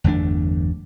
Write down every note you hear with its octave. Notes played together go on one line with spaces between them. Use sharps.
G1 E2 A3 D4